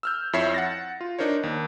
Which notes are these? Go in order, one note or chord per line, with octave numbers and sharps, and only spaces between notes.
E6 F6 G6
F2 E4 C#5 E5 C7 E7
F#5 A6 A#6
F4
D4 D#4 A#4 C5 C#5
D#2